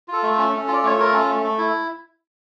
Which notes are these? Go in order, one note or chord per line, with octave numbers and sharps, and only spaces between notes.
F4 A4
A3
A4
C#4
C#4
F4
D5
A3 C#5
F4 A#4
C#4 A4
A3
A3
E4